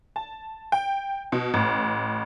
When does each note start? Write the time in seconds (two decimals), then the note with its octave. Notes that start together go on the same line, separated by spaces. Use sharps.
0.16 A5
0.72 G5
1.32 B2
1.54 A1